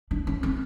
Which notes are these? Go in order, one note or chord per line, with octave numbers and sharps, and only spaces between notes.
D4
C#4
C4